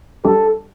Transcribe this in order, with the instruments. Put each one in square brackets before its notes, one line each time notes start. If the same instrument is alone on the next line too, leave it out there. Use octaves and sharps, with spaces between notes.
[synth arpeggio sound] G3 D4 G4 [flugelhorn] A4